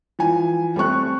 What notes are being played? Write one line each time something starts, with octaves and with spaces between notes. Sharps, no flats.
E3 F3 G#5
G3 A3 C4 C#6 F#6